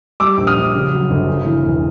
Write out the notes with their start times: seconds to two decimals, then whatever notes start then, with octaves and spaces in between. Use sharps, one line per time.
0.20 G3 D6 E6
0.38 A#1
0.47 D#6 F6
0.56 A#1
0.74 C#3
0.92 F#3
1.10 G1
1.27 C#3
1.45 E3
1.63 E1